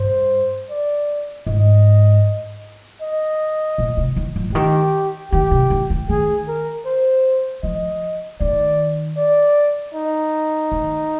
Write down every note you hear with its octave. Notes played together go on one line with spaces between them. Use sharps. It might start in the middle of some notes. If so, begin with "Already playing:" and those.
Already playing: G2 C5
D5
G#2 D#5
D#5
A#2
C3
D#3
F3
D3
D#3 G4
D#3 G4
C3
D#3
D3
D#3 G#4
A#4
C5
F3 D#5
D#3 D5
D5
D#4
D#3